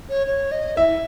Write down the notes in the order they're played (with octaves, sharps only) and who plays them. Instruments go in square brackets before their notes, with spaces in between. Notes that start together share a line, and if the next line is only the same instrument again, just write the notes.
[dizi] C#5
C#5
D#5
[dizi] E4 [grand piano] E5